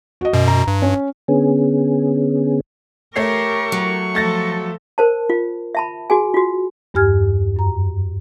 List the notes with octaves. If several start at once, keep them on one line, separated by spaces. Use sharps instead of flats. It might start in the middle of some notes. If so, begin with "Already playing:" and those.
F#4 D#5
F#2 B2
A#5
G2
C#4
D3 B3 C#4 G#4
A3 G4 A#4 C#5 C#6 C7
F#3
F3 A3 A4 A6 A#6
A#4 C5 A5
F4
E5 A5 B5
F#4 G#4 G#5
F4 F#4
E2 G2 G4 G#5 F6 G#6
F#2 A#5